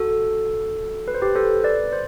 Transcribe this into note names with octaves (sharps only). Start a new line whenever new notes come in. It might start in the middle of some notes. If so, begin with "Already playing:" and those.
Already playing: F#4 A4
B4
C5
G4 B4
A4 C5
B4 D5
C5